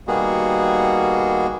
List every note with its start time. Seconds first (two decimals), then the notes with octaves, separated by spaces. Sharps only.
0.08 D#3 G3 A#3 B3 F#4 G#4